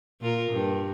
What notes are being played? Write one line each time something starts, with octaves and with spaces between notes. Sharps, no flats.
A#2 F4 A#4
G2